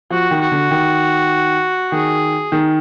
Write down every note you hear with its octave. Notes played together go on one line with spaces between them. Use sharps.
F3 F#4
D#3
F#4
D3
D#3
D#3 G#4
D#3